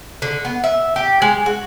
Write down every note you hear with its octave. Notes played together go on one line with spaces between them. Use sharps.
D3
B3
E5
G4
G#3
F#4